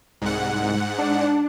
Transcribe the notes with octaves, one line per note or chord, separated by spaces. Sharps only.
C2 G#2 F#5
D4